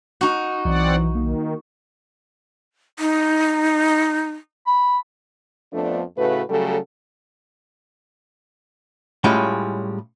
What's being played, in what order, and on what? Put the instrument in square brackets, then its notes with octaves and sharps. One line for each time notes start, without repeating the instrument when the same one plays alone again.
[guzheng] D#4 F#4
[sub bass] B1 [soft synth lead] E3 [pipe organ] C4 D5 F#5
[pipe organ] D#3 [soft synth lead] A#3
[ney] D#4
[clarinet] B5
[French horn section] F2 F3 A3 B3 D4
A2 C#3 A3 F#4 B4
C#3 F#3 G3 A3 A4
[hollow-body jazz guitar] A2 G3 G#3 C#4 E4 F4